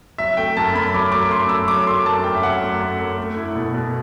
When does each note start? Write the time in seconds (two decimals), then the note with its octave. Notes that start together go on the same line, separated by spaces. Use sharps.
0.18 F#3 E5
0.37 A3 G5
0.57 F#2 A5
0.74 F#2 B5
0.94 F#3 D6
1.12 A3 D6
1.31 F#2 C6
1.49 F#2 E6
1.68 F#3 D6
1.87 A3 C6
2.06 F#2 A5
2.24 F#2 G5
2.35 E5
2.43 F#3 F#5
2.61 A3
2.80 F#2
3.00 F#2
3.18 A3
3.37 E4
3.55 B2
3.74 B2